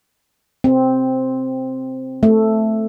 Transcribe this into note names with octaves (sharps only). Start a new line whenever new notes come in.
C4
A3